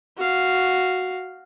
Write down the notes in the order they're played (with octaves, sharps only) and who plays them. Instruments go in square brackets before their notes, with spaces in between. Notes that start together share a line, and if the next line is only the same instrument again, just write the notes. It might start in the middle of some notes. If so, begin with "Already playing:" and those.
[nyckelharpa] F#4 F5